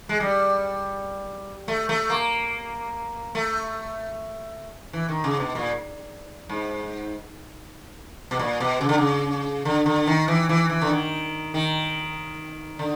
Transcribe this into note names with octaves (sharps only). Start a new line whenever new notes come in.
G#3
G3
A3
A3
A#3
A3
E3
D#3
C#3
B2
A#2
G#2
B2
A#2
B2
C#3
D3
C#3
D3
D3
D#3
E3
E3
E3
D3
D#3
D#3
D3